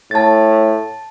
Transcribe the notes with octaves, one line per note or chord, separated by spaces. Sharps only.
A2 A5 A6